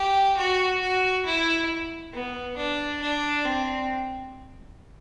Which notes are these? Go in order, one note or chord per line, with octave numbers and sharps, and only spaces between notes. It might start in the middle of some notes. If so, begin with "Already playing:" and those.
Already playing: G4
F#4
F#4
E4
B3
D4
D4
C4